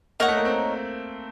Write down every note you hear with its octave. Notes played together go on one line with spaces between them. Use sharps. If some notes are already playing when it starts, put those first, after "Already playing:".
A#3 D#4 A#4 C#5 F#5
A3
A#3
C4